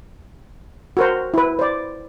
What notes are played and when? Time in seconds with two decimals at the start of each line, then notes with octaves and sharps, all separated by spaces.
0.97 F#4 A#4 C5
1.34 E4 B4
1.59 C5 D5